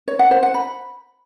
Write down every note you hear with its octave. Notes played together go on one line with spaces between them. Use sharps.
C#5
F#5
C5
F#5
B5